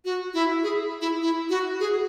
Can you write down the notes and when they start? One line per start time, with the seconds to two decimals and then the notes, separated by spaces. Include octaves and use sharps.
0.05 F#4
0.34 E4
0.63 G#4
1.01 E4
1.21 E4
1.50 F#4
1.80 G#4